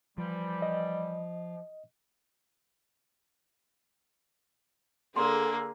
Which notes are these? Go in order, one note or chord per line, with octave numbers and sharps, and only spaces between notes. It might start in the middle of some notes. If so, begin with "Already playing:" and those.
E3 F3 G3
D#5
D3 A#3 G#4 A4 C6